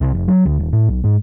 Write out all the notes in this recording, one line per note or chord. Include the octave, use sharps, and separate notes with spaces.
C2
F1
F#3
D2
D#1
A2
B1
G#2